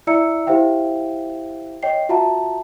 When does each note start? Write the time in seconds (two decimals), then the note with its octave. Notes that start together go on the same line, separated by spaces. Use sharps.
0.07 E4 D5 E5 A#5 E6 C#7
0.47 E4 G4 C5 E5 F5 G5
1.83 C#5 D#5 G5 C7
2.09 F4 F#4 E5 F#5 A5 A#5